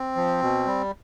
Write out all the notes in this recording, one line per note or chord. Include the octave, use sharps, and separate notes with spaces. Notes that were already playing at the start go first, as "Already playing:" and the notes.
Already playing: C4
F3
B2
G3